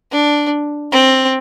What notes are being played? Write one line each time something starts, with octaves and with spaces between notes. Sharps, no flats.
D4
C4